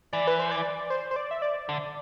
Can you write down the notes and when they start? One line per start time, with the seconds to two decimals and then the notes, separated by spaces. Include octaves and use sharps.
0.13 E3 D5
0.27 B4
0.39 C5
0.51 D5
0.90 C5
1.11 C5
1.16 D5
1.31 E5
1.42 D5
1.69 D3